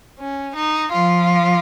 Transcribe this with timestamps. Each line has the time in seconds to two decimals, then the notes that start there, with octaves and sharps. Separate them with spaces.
0.19 C#4
0.55 D#4
0.91 F3 F4